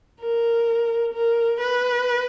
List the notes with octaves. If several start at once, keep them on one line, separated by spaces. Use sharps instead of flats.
A#4
A#4
B4